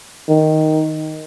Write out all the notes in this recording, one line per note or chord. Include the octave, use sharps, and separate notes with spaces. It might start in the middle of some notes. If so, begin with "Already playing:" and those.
D#3